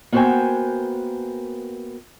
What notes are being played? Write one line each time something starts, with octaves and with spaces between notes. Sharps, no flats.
A#3 B3 F#4 C5 G5 G#5